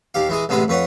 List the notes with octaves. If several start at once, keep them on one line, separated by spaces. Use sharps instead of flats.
D#2 G4 F5
E3 G#3 G#4
A1 C3 G#3 B3 B5
F2 B4 C#5 F#5